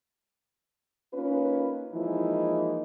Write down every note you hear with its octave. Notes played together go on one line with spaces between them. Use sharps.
A#3 C#4 D#4 F4 B4
E3 F3 G#3 A#3 D#4 E4